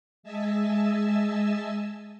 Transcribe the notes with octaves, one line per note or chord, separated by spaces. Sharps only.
G#3 D#5 E5 G#5 A5 E6